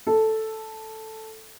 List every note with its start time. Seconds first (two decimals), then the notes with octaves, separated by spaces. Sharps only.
0.07 A4